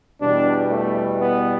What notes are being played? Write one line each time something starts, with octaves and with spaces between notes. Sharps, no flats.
E2 B2 G3 D4
A3
B3